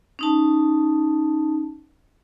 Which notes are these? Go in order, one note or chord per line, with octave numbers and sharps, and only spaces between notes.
C#4 D#4 A5